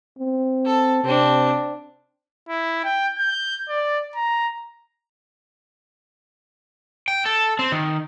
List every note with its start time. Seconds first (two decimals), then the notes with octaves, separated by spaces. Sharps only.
0.19 C4
0.66 A4
1.04 C3 C4 D4
2.49 E4
2.85 G5
3.18 G6
3.69 D5
4.16 A#5
7.08 G5
7.26 A4
7.59 C4
7.72 D#3